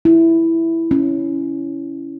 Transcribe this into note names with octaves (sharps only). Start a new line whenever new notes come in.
E4
C#4